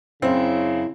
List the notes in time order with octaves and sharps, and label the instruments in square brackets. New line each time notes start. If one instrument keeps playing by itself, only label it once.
[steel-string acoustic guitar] F#2 E4 [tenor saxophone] C#3 [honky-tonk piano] C4